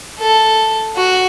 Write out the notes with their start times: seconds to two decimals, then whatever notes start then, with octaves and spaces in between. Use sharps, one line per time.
0.20 A4
0.96 F#4